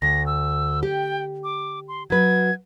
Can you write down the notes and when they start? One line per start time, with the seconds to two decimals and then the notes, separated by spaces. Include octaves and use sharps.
0.02 D2 A#6
0.26 E6
0.83 G4 G5
1.44 D6
1.88 C6
2.10 F#3 B4 G#6